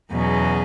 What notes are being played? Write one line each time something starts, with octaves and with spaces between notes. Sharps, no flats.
E2 B2 F#3 C#4 G#4